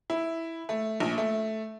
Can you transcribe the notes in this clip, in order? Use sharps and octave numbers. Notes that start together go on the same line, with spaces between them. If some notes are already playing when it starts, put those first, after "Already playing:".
E4
A3
A#1
A3